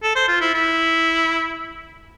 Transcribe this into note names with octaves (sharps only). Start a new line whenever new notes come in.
A4
C5
F4
E4
E4